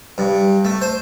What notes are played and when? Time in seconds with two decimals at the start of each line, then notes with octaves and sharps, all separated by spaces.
0.18 G2
0.65 A3
0.82 C5